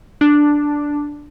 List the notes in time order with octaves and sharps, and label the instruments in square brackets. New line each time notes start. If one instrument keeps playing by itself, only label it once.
[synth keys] D4